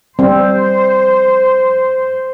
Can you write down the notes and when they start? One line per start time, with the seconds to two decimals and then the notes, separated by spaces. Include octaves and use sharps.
0.19 G3 C4 C5